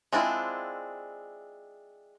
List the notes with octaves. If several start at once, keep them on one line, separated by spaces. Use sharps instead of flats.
G#3 C4 D4 E4 F4